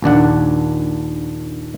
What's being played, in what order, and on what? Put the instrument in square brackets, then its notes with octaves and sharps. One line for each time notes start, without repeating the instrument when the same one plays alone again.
[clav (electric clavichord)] A#1 D#2 D4 F#5